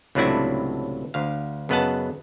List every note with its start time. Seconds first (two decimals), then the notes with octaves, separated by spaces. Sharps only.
0.15 C#2 A2 C3 F#3 D4 E4
1.14 D2 F5
1.69 F#2 C#3 B3 D#5 F#5 A5